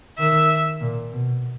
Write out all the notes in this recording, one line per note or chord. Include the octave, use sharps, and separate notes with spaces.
D#3 E5
A#2
B2